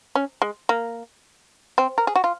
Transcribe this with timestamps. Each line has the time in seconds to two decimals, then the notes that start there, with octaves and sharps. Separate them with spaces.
0.15 C#4
0.42 G#3
0.69 A#3
1.78 C4
1.98 A#4
2.07 G#4
2.16 F#4
2.24 F4